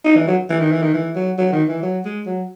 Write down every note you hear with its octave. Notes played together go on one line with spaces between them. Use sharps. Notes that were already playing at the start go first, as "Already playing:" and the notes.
D#4
E3
F#3
E3
D#3
E3
D#3
E3
F#3
F#3
D#3
E3
F#3
G#3
F#3